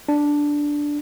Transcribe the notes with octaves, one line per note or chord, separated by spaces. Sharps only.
D4